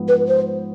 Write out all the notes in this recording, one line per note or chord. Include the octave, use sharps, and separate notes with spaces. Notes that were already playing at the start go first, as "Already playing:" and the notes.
Already playing: G#2 F3 B3
B4
C5